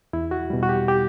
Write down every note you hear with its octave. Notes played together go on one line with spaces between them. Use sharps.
E2 E4
F#4
B2 G3
F#4
G4
G4